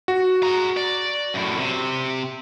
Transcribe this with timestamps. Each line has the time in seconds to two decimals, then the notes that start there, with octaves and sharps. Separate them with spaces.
0.08 F#4
0.43 G#4 A#5
0.77 D5
1.34 F#2 A2
1.59 C3